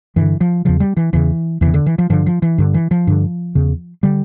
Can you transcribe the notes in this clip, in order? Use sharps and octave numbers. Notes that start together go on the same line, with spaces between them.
G2 D3 E3
F3
E2 C#3 F3
G3
E3
E2 C#3 E3
E2 C#3 E3
D3
E3
F3
G2 D3 F3
F3
E3
G2 D3
E3
F3
G2 D3
E2 C#3
D3 G3